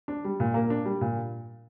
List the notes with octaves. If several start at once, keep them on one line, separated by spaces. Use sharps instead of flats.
D4
G3
A#2
A#3
D4
G3
A#2